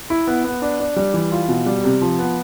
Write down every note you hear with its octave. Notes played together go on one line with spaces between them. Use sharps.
E4
B3
B3
D4
D4
G3
E3
F4
B2
G3
C3
F3
B3